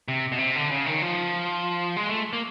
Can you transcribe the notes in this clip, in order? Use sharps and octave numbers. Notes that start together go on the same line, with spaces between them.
C3
B2
C3
D3
C#3
D#3
F3
G#3
A3
A#3